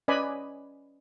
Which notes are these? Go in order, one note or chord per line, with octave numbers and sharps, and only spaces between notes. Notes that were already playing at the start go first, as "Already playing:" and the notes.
C#4 B4 D5 D#5 G#5 B5